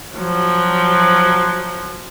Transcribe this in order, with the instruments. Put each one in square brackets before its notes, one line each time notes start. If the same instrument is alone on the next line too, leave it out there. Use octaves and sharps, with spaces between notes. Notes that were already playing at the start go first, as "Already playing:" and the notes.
[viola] F3 F#3